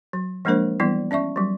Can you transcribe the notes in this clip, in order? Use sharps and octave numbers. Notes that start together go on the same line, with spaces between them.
F#3
F3 G#3 A#3 D4 A#4 C5
E3 G3 B3 E4 D5
C#4 D5 E5 C#6
F#3 G3